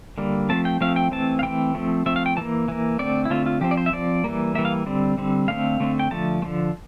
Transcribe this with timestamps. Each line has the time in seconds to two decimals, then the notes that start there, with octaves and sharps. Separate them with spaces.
0.18 D3 G3 A#3
0.49 F3 A3 C4 A5
0.65 G5
0.81 F3 A3 C4 F5
0.96 G5
1.12 E3 A3 C4 A5
1.39 F5
1.43 E3 A3 C4 G5
1.75 F3 A3 C4
2.06 F3 A3 C4 E5
2.16 F5
2.26 G5
2.37 E3 A#3 A5
2.68 E3 A#3
2.99 D3 A3 C4 D5
3.25 E4
3.30 D3 A3 C4 F4
3.46 F4
3.61 F3 C4 G4
3.71 D5
3.77 C5
3.86 E5
3.92 F3 C4 D5
4.24 E3 G3 A#3
4.55 E3 G3 A#3 E5
4.65 F5
4.86 D3 G3 C4
5.18 D3 G3 C4
5.48 D3 A3 C4 F5
5.80 D3 A3 C4
5.99 G5
6.11 D3 F3 A3 A5
6.42 D3 F3 A3